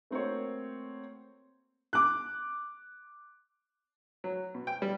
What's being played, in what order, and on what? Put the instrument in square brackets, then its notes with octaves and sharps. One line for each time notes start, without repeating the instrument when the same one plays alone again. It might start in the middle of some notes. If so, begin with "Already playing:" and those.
[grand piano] A3 A#3 C4 F#4 C5 C#5
[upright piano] D6 F#6
[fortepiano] F#3
B2
G5
G3